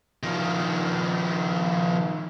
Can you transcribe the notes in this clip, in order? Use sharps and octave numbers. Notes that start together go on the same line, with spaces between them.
D#3 F3